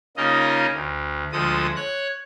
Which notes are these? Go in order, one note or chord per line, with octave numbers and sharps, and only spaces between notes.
C#3 A#3 D#4 F4 D#5
D2
D2 F3 G#3 A4 D#6
C#5 F#6